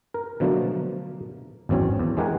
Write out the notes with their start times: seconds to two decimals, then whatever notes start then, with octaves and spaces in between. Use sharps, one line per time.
0.14 A#4
0.40 B2 D3 F3 F#3 A3 A#3
1.69 G#1 E2 F#3 C4 C#4 C#5
1.99 E2
2.17 E3 G#3 G4 A#4 F#5 G#5